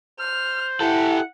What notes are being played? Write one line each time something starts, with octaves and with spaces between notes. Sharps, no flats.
C5 F6
E4 G4 A4 F#5